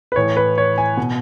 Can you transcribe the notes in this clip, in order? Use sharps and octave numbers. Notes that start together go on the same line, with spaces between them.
B4
A2 E3 C#5
B4
C#5
G#5
B2